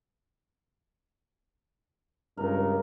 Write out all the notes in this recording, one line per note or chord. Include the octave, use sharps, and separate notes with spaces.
C#2 G2 A#4